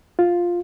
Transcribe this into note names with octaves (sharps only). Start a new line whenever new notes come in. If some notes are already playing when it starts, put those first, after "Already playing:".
F4